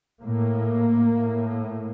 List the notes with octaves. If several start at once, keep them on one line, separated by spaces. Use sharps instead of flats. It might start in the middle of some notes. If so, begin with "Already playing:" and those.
A2 A#3
A2